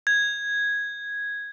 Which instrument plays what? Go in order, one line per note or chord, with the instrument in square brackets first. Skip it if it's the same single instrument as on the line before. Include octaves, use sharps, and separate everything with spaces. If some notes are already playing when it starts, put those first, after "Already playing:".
[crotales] G#6